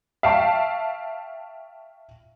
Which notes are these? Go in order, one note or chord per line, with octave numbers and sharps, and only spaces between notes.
E5 F5 G5 A5 C#6